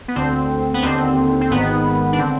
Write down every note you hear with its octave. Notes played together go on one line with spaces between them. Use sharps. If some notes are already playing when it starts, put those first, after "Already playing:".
B3
D2 D3 C4
B3
D#2 D3 C4
C4
G#1 G#2 D#3 B3
D4
D3 C4